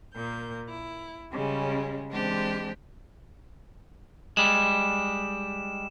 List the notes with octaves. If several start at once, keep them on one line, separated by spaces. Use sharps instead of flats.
A#2 A#3 G6
E4
C#3 G3 G#3 C#4
E3 G#3 C4 D4 G4 C5
G3 G#3 E7